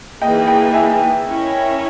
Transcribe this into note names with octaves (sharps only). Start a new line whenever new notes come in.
E3 A#3 D#4 G#4 D#5 G5
D#5 G5
E5 G#5
C#4 E4 A#4 C#5